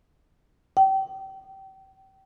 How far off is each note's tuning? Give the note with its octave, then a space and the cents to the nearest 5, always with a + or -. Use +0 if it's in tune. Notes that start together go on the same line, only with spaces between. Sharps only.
G5 -30